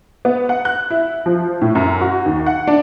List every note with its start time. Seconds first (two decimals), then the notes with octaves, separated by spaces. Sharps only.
0.25 B3
0.49 F#5
0.65 F#6
0.90 E4
1.26 F3
1.61 A2
1.75 F#2
2.01 F#4
2.26 D#2
2.46 F#5
2.67 D4